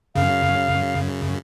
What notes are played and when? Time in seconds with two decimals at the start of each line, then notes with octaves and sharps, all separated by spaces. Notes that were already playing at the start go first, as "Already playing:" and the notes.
0.15 F#2 C#3 F5